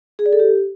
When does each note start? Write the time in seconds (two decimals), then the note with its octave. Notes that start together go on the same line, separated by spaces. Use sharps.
0.19 G#4
0.26 D5
0.32 A4
0.39 G4